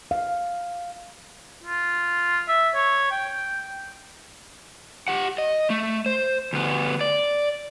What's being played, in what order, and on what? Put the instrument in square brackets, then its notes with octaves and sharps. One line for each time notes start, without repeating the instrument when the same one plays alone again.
[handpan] F5
[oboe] F4
E5
C#5
G5
[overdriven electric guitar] G4 F#5
D#5
A3
C5
D2 B3
D5